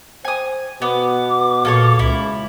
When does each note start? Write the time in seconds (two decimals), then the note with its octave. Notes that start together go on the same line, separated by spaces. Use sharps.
0.25 C5 G#5 D#6
0.82 B2 B3 D6
1.65 A#2 A#3 A4 C#5
1.99 C#2 E4